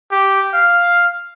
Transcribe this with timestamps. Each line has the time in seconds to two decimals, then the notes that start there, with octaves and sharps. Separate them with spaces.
0.11 G4
0.54 F5